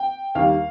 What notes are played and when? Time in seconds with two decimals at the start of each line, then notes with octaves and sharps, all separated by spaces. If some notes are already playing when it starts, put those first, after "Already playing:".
Already playing: G5
0.35 D#2 D#3 G3 F5